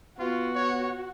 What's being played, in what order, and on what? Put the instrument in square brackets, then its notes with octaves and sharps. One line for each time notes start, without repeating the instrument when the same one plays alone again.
[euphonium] B3 [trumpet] F4 [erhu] F#4
[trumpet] C#5